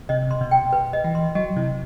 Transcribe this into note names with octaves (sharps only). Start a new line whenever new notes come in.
C3 D#5
C6
B2
G5
B4
D#5
E3
C6
F#3 D#5
C3 E4